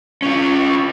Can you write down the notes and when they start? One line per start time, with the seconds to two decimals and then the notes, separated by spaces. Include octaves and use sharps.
0.22 C#4 F4